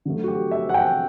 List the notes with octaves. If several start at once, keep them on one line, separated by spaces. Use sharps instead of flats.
D3 F#3 A3
F#4
G4
E5
F#5
G5